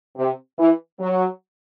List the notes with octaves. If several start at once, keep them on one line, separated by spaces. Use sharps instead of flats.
C3
E3
F#3